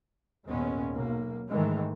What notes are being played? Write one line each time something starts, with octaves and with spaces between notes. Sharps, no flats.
G#1 D#2 A#2 G#3 B3 C#4
B1 A#3
G#2 D#3 E3 G#3 A3